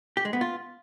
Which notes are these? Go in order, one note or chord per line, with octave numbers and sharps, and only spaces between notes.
G4
G#3
B3
F4